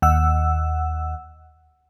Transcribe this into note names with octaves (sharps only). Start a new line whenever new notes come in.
D#2 F#5 E6